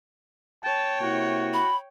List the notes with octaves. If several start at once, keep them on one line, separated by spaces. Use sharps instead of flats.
C#5 G5 A5
C3 A#3 E4 F#4
B5